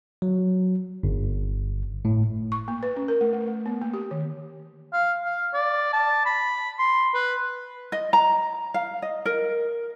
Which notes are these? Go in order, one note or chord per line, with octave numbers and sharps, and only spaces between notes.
F#3
G1
A2
C#6
A#3
B4
C#4
A#4
A3
A3
A3
B3
A#3
G4
D#3
F5
F5
D5
A5
B5
C6
B4
D#5
A#5
F5
D#5
A#4